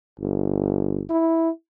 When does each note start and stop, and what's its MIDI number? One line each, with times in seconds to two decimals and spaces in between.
0.20 1.01 31
1.10 1.50 64